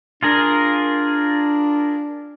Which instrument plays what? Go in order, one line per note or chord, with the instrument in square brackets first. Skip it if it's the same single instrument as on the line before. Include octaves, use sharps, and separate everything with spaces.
[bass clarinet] D4 [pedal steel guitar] F4 G#4 A#4